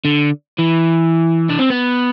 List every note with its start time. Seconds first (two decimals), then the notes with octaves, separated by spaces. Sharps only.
0.05 D3
0.59 E3
1.50 D4
1.59 C4
1.70 B3